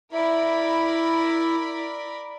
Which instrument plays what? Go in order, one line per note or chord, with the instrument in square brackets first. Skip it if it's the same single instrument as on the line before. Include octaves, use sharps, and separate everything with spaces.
[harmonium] E4 [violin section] A#4 D5 B5